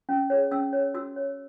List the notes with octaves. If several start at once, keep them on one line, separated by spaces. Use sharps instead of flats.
C#4
G#4 C#5
C#4 E6
G#4 C#5
F#4 E6
C#5